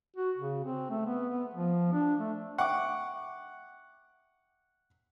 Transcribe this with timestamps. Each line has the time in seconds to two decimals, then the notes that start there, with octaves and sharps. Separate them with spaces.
0.16 F#4
0.38 C#3
0.65 C4
0.90 A3
1.06 B3
1.30 B3
1.54 F3
1.93 D4
2.19 A3
2.58 E5 F#5 G5 C#6 D6